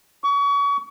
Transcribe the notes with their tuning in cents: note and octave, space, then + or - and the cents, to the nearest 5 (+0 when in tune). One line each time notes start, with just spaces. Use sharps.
C#6 +35